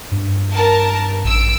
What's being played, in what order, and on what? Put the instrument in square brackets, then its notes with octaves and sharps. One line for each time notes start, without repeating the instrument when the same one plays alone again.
[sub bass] G2
[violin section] A#4 A5
[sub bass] A1 [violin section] E6 D7